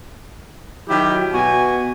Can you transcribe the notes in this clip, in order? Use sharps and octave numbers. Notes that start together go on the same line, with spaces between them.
D#3 F#3 E4 G4
B2 B3 F#4 G#5